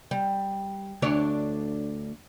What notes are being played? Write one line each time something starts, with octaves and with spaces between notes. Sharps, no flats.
G3
D2 D4 C#5